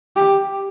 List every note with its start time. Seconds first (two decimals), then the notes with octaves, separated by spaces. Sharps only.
0.16 G4